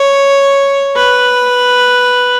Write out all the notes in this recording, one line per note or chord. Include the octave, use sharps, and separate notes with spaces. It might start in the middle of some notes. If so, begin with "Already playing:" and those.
Already playing: C#5
B4